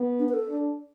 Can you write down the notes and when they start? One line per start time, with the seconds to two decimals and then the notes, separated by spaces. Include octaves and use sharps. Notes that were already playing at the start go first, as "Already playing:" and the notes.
Already playing: B3
0.19 D4
0.29 B4
0.34 A4
0.48 D4